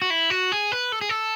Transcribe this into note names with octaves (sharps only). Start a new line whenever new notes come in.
F#4
E4
F#4
G#4
B4
A4
G#4
A4